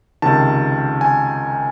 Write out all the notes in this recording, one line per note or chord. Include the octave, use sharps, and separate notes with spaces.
C#2 C3 D#3 A5
G#5